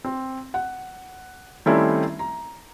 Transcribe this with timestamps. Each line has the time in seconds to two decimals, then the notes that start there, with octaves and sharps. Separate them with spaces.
0.04 C4
0.54 F#5
1.66 D#3 G3 A3 C4 C#4 E4
2.19 A#5